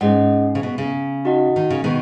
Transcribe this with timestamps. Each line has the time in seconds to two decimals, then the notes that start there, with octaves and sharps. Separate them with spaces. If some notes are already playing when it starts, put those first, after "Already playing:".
0.01 G#2 C#4 G#4 D#5 F#5
0.55 C#3
0.63 B2
0.78 C#3
1.25 D#4 F#4 D#5 F#5
1.56 D#3
1.70 C#3
1.84 B2 D#3